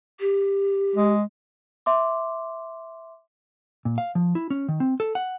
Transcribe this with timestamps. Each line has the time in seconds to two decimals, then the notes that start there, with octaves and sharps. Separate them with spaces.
0.20 G4
0.96 G#3
1.86 E5 C6 D6
3.85 A#2
3.98 F5
4.15 F3
4.35 E4
4.50 C#4
4.69 D#3
4.80 C4
5.00 A4
5.15 F#5